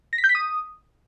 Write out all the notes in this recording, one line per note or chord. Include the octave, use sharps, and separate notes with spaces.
A#6
B6
G6
B6
D#6